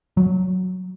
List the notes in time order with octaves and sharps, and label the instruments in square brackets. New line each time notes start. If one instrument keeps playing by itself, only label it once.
[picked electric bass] F#3